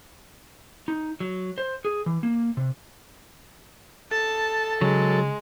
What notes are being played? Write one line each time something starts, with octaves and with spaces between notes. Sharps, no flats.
D#4
F#3
C5
G#4
E3
A#3
C3
A4 A5
C#3 F#3 G#3